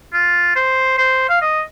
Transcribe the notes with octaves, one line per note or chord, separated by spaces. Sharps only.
F4
C5
C5
F5
D#5